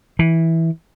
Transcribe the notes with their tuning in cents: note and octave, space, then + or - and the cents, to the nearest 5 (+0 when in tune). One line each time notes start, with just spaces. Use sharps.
E3 -10